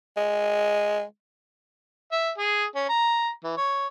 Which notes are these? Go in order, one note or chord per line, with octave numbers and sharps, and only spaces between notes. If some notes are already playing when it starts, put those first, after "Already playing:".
G#3
E5
G#4
C#4
A#5
E3
C#5